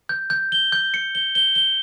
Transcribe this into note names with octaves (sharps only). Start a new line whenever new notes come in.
G6
G6
G7
G6
C#7
G7
G7
G7